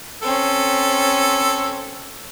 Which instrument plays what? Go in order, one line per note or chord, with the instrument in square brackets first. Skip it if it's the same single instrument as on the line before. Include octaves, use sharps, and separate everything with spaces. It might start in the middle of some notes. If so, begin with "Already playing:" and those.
[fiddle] C4 C#4 [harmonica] A4